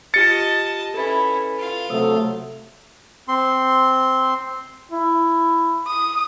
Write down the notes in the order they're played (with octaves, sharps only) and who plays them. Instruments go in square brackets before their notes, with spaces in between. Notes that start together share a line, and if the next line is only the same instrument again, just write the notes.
[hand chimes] F4 G4 F6 [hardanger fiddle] D#5 A5 [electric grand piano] A6 C#7
[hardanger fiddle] C#4 E4 [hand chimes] A4 B4
[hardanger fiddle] F4 F5
[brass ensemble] C3 F#3 A3 [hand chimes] C5 D#6 E6
[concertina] C4 C6
[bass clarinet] E4
[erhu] D#6